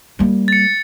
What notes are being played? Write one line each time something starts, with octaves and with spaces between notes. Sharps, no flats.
G3 A#3
A6 C#7